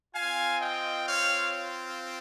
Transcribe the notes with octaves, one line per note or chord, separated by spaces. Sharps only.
C4 F4 F5 G#5
D#5 G5
C#5 F5